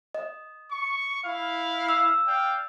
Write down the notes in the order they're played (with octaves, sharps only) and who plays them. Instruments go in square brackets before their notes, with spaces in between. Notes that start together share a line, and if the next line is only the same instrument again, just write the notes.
[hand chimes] D#5
[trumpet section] C#6
E4 F5
[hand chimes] E6
[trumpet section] D5 F5 G5